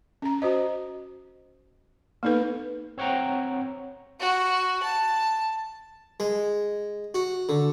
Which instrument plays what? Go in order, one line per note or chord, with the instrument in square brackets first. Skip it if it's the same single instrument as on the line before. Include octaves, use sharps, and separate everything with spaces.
[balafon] C#4 A#5
F#4 C5 D#5
A#3 B3 D#4 A4 B4
[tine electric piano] C4 C#5 F#5 G5 A#5
[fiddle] F#4
A5
[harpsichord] G#3
F#4
D3